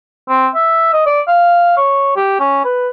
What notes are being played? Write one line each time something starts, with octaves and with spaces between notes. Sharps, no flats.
C4
E5
D#5
D5
F5
C#5
G4
C#4
B4